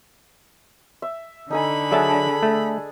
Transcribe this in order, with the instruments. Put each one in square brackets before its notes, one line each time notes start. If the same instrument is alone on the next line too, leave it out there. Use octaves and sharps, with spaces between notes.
[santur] E5
[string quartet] D3 B5 [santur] D#4 A4 G#5
[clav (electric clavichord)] F#3 E5 A5 [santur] D4 G#4 A4
[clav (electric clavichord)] A3